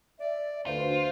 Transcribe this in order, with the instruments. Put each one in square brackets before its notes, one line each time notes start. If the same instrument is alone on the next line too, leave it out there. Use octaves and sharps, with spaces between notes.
[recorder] D5 [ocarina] E5
[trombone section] D2 [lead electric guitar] F4 [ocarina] B4 [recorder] C5